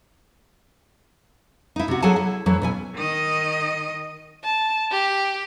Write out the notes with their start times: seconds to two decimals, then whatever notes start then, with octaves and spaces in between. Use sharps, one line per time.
1.76 D#4 E4
1.88 C3 F#4
2.02 F#3 G#4 A4 F#5 G#5 A5
2.16 E4
2.46 F2 E3 F#3 A3
2.62 B2 E4 G#5
2.95 D#3 D#5
4.44 A5
4.91 G4